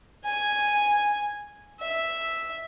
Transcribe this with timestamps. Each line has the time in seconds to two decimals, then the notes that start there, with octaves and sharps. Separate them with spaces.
0.25 G#5
1.80 E5